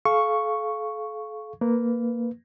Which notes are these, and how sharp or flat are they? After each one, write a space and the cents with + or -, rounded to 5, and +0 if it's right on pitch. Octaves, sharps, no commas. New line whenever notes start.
A4 -40 F5 +0 C#6 +0
A#3 -5 B4 +0